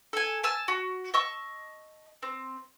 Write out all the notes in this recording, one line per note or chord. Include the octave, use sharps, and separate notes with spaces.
A4 G#5
G#5 A5 E6
F#4
D#5 A5 C#6 E6
C4